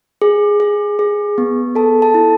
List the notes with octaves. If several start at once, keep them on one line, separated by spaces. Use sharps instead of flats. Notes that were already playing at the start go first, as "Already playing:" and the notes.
G#4
G#4
G#4
B3
A4 A5
A5
E4